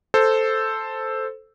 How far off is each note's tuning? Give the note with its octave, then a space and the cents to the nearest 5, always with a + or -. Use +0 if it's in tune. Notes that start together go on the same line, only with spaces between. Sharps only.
A4 +0 C5 +0